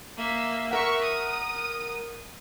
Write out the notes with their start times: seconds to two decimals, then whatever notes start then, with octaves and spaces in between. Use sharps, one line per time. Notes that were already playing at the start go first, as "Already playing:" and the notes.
0.18 A#3 E5
0.71 A#4 E5 F#5 C#6
1.02 D#6